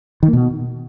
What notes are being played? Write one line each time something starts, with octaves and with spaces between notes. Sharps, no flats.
D#3
A#3
B2